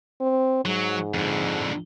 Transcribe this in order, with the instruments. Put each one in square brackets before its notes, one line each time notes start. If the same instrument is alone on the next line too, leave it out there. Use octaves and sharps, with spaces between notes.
[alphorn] C4
[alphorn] G#2 [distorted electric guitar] F#3
[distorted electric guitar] F2 D3